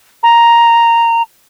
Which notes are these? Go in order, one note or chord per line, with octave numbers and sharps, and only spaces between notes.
A#5